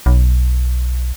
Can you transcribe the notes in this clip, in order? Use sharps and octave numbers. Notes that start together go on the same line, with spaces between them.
B1